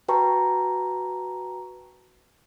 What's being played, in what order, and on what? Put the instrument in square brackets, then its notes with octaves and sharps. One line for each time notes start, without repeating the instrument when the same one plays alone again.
[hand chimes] F#4 B4 G5 A5 A#5 C#6